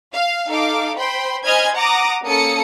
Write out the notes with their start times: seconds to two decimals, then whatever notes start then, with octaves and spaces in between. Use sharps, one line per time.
0.13 F5
0.46 D#4 A4 F5 D6
0.97 C5 G5 B5 C6
1.44 C5 D#5 G#5 B5 F6 G#6
1.74 F#5 A#5 D6 D#6 A#6
2.24 A#3 C#4 A4 A5 D#6 C#7